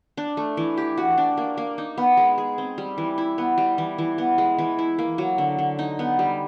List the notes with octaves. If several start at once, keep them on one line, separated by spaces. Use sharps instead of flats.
D4
A3
E3
G4
F#4
D4
A#3
A#3
D#4
B3
G#3
G#4
C4
G3
E3
E4
B3
G3
E3
E3
B3
G#3
E3
E4
A#3
F#3
D3
D3
D#4
B3
G3